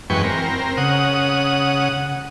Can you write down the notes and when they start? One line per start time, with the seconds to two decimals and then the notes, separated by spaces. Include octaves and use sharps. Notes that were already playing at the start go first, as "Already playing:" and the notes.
0.10 F#2 E3 G#3 B4 G5 C#6
0.24 C4 A#4
0.77 C#3 F#5 D#6